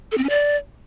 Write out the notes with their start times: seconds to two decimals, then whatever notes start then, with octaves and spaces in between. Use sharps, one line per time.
0.12 A4
0.18 C4
0.24 C#4
0.29 D5